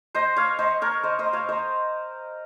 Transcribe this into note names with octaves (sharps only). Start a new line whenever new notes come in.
C5 D#5
C#5 F5
C5 D#5
A#4 C#5
C5 D#5
C5 D#5
C#5 F5
C5 D#5